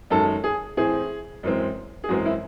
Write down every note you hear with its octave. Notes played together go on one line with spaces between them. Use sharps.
F#2 D#3 G#3 A4
G#4
A2 E3 C4 G#4
F#2 E3 G#3 C4
G#4
F#2 E3 G#3 C4 F#4
E4